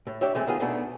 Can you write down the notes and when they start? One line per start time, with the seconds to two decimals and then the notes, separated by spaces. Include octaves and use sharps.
0.07 A2
0.21 D4 G4 C#5 E5
0.35 E3 G#3 A3 C4
0.47 D#3 B3 F4 G#4
0.60 G#2 B2 A3 B3 D4